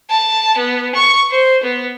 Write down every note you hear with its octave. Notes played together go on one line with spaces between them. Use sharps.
A5
B3
C#6
C5
B3